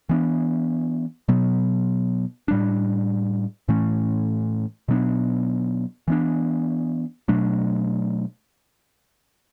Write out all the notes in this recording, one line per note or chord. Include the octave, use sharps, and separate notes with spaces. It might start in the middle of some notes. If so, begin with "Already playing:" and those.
E3 B3 D4
B2 F#3 B3
A2 G3 D4
A2 E3 A3 C#4
B2 F#3 B3 D4
E3 B3 D4
B2 F#3 A3 D4